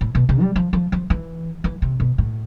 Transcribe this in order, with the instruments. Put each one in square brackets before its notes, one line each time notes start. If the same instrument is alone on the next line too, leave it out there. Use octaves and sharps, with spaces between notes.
[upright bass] A2
B2
C3
G3
F3
F3
F3
E3
E3
C3
B2
A2